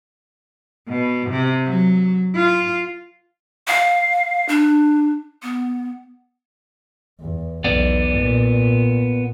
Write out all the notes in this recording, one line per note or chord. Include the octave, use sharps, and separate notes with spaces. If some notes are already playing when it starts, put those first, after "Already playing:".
B2
C3
F#3
F4
F5
D4
B3
E2
B1 E2 B3 D5
A#2